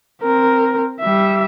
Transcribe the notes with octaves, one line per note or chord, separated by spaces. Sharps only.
C4 A#4
G3 E5